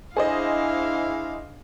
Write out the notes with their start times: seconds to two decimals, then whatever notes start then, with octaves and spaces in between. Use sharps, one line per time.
0.17 D4 E4 G#4 C5 D#5 F5